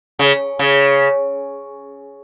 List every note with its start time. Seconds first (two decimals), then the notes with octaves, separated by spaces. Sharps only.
0.19 C#3
0.59 C#3